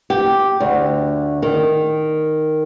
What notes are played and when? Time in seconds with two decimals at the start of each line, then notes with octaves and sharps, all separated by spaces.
0.10 G4
0.60 D2
1.42 D#3